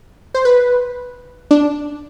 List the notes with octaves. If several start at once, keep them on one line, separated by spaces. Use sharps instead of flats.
C5
B4
D4